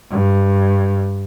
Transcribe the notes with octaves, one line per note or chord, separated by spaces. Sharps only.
G2